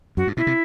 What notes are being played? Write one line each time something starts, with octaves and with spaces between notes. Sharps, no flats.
F#2 F#4
G2
B2 E4
C3